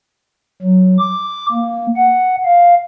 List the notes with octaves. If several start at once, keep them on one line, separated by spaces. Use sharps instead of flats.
F#3
D6
A#3
F#5
F5